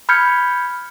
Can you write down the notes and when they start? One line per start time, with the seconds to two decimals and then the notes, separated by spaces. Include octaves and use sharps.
0.09 B5 F6 G6 G#6 C#7